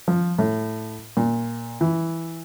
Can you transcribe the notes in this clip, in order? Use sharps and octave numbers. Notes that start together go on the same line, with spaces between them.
F3
A2
A#2
E3